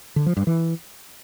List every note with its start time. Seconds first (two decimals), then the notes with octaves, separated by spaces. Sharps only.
0.16 D3
0.26 F3
0.37 G2
0.47 E3